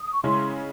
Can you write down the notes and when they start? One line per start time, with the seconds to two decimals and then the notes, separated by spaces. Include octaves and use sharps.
0.01 D#6
0.13 C#6
0.24 C#3 G#3 C#4 E4 C6